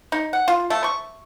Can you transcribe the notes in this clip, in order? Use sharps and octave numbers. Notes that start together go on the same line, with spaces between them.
D#4
F#5
F4
A3
C#6